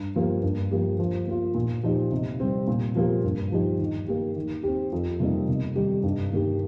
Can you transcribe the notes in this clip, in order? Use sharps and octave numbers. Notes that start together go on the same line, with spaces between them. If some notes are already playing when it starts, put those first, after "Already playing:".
Already playing: G2
F3 A#3 G4
G2
F3 A#3 G4
F3
A#3 F4
A#2
F3 D#4 G4
C3
G3 C4
A#2
F3 A#3 G4
G2
F3 D#4 G4
D#3
A#3 G4
D#3
C4 G4
F2
C3 G3 A#3 D#4
C3
D#3 G3 D#4 G4
G2
D#3 A#3 G4